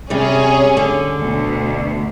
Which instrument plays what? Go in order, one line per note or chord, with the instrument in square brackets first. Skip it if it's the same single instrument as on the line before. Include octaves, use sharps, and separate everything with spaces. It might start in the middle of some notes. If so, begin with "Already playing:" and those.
[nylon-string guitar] C3 G3 [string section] C#4 G#4
[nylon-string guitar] D3
[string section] D2 B2